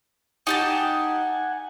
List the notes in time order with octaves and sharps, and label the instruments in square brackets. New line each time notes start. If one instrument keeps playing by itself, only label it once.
[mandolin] D#4 G4 A5 [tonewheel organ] F#5 G#5